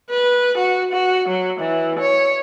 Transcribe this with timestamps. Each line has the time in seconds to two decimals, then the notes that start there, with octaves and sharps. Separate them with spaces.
0.10 B4
0.58 F#4
0.92 F#4
1.28 F#3
1.60 E3
1.99 C#5